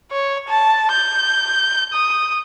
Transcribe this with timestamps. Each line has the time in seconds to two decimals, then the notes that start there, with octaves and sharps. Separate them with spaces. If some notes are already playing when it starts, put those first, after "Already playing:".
0.12 C#5
0.48 A5
0.92 G6
1.93 D#6